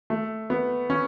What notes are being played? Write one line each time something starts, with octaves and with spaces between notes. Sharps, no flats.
A3
B3
C#4